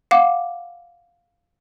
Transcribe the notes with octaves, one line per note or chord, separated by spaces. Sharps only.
F5 F#5 D6